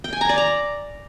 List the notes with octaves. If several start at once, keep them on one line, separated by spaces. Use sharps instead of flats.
G5
G#5
A#5
D5
A#5